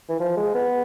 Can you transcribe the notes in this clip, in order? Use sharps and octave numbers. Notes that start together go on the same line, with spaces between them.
E3
F3
G#3
B3